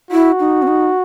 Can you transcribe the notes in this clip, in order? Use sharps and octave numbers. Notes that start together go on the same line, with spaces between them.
E4 F#4
D#4
C4
D#4